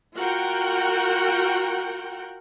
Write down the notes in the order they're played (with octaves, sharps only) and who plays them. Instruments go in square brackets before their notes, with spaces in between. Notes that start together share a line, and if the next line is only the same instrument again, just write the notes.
[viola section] F4 F#4 A#4 F#5 G5